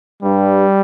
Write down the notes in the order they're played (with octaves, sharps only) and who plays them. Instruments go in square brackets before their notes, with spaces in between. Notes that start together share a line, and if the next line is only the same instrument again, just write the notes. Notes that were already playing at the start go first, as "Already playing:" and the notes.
[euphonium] G2 [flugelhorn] G3